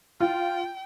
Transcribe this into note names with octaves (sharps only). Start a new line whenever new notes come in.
F4 G5